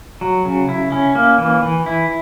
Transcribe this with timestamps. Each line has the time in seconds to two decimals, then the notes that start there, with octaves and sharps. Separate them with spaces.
0.21 F#3
0.45 C#3
0.69 E4
0.92 C#4
1.15 A#3
1.38 E3
1.63 E3
1.86 E4